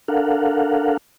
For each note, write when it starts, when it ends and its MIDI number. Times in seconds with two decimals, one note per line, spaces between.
0.08 0.97 62
0.08 0.97 69
0.08 0.97 70
0.08 0.97 77
0.08 0.97 78